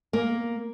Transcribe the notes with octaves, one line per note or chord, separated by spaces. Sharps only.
A#3